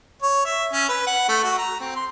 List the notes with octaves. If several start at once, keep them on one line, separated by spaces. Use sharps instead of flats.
C#5
E5
C#4
B4
F#5
A3
F#4
A#5
C4
C6